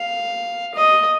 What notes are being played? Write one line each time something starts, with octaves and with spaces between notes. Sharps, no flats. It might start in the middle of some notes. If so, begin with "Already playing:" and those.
Already playing: F5
D#5